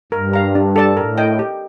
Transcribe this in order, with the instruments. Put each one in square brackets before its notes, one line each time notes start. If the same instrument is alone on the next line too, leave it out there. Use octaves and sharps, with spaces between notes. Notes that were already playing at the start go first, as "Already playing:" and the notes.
[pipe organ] G2 [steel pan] A#4
[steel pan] F5 A#5
D4
A4 D5 A5
[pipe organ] A2 [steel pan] A#4
[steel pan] D#5 G5
G4